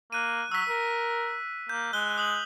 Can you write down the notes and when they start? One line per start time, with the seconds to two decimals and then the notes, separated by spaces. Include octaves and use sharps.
0.12 A#3 F#6 D#7
0.52 F#3 E6 B6
0.69 A#4
1.69 A#3 G6
1.93 G#3 F#6 G7
2.18 D#6 F#7